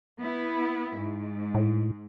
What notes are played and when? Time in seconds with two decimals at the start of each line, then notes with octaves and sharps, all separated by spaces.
0.21 B3 E4
0.97 G#2
1.54 A2